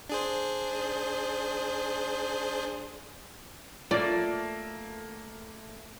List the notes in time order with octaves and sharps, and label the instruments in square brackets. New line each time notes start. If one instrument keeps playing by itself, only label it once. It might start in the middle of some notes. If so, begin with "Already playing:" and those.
[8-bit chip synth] D4 G#4 C5
[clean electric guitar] A3 A#3 [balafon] F4 [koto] D5